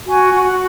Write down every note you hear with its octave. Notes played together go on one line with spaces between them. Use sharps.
F#4 G#5
F#4